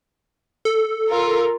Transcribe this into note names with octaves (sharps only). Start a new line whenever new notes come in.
A4
F4 A#4